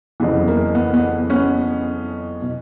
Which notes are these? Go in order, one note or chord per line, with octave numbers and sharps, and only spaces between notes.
F#1 F2 C#3 E3 B3
A#3
B3
B3
B3 C#4
B2